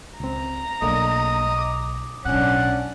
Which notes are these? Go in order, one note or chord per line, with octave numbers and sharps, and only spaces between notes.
C#2 C4 A#5
B1 A3 A#3 D4 D#5
D6 D#6
B1 A2 C#4 D4 F#5